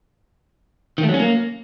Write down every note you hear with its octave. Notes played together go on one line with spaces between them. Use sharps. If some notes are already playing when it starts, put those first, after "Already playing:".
D#3
A3
F#3
C#4
A#3